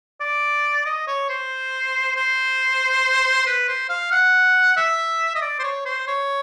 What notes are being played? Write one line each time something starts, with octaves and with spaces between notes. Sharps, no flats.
D5
D#5
C#5
C5
C5
B4
C5
F5
F#5
E5
D#5
D5
C5
C#5
C5
C#5